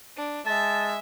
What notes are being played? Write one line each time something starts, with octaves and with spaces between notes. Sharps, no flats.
D4
G#3 E5 A5